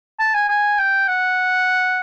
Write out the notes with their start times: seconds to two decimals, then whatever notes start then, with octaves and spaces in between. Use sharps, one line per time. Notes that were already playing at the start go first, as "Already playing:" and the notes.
0.19 A5
0.34 G#5
0.49 G#5
0.79 G5
1.08 F#5